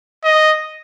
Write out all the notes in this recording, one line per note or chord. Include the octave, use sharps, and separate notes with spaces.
D#5